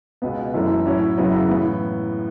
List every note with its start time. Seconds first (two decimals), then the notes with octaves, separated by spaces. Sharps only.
0.22 C#2 B2 B3
0.54 F#2 E3 A3 C#4
0.85 A2 F#3 C#4 E4
1.17 F#2 C#3 F#3 B3 E4
1.49 A2 E3 B3